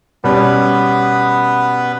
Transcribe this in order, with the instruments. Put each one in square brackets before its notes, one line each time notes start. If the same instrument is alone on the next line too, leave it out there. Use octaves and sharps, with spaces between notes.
[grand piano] B2 G3 C#4 [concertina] B3 B4